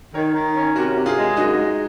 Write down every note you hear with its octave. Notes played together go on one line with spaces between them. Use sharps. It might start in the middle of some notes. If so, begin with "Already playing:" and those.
D#3 A#4 C#5
D#3
C#4
C3 F#4 A#4
C3
F4 G#4
G#3
F#2 D#4 F#4
G#3